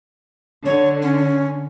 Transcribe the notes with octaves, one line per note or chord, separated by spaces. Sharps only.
D3 C#5
C#4